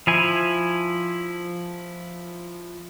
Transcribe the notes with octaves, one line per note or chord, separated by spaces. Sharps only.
F3 E4 G#5